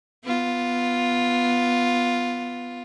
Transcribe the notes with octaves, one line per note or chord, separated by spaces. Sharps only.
B3 F4